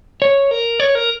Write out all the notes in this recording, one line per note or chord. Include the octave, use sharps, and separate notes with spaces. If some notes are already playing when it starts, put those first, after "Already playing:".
C#5
A#4
C#5
A#4